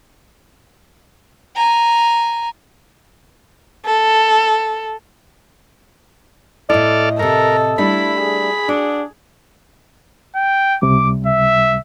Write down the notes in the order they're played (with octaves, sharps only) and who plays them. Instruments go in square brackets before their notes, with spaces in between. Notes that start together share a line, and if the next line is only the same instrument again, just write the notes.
[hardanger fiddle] G#5 A#5
[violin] A4
[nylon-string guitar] A2 E4 [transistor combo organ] A4 D5 F6 [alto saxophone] D#5
[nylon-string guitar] A2 C3 [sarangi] A4 [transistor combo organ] A#4
[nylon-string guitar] G3 A3 D4 [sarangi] E4 [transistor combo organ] B5
[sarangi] G#4
[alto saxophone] D4 [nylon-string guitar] F#4
[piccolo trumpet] G5
[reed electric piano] C#2 C3 G3 [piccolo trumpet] D6
[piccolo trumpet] E5